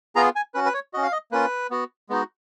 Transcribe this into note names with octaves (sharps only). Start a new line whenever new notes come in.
B3 F4 G#4 A#5
G#5
C#4 F#4 B4
B4
C#5
C#4 F#4 D#5
F5
D#5
A#3 C#4 F4 B4
B3 F#4
G#3 B3 D#4 F#4